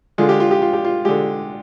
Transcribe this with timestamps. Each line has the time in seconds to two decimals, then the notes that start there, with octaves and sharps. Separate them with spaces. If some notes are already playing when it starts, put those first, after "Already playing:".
0.18 D3 G#3 F4
0.29 G4
0.40 F4
0.51 G4
0.62 F4
0.73 G4
0.84 F4
1.05 D3 G#3 G4